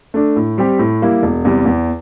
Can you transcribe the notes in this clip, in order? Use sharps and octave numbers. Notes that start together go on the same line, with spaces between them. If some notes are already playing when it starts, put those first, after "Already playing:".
A3 D4
A2
G3 C4 G4
A2
G3 A#3 E4
E1
E2 C3 G3
E2